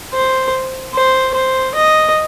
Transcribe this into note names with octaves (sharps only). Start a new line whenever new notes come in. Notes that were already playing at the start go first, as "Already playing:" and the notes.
C5
C5
C5
D#5